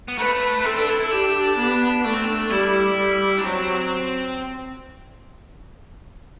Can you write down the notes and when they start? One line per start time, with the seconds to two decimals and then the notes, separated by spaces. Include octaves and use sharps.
0.08 B3
0.18 A3 B4
0.64 C4 A4
0.76 D4
0.89 E4
1.00 E4
1.11 D4 G4
1.58 B3
2.04 A3 D4
2.14 C4
2.24 D4
2.50 G3 E4
2.97 G3
3.38 D4
3.43 F#3 C4